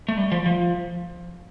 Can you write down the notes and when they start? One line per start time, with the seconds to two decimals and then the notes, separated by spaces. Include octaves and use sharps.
0.08 A3
0.17 G3
0.32 F3
0.46 F3